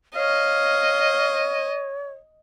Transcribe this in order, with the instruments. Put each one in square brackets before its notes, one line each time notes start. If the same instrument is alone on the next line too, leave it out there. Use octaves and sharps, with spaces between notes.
[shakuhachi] C#5 [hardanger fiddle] D#5 [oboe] F5